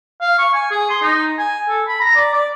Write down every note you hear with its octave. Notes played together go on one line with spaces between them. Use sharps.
F5
C#6
G#5
G#4
C6
D#4
G#5
A4
B5
A#5
D5
D5